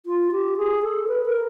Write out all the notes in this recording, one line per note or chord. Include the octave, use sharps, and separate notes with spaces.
F4
G4
G#4
A4
B4
A#4